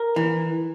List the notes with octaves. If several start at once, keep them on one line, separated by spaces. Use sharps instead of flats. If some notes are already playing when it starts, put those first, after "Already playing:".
Already playing: A#4
E3